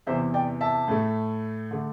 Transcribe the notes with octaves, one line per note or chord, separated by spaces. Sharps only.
E2 C3 E3 C5 E5
D5 G5
E5 A5
A2 A3
D3 A3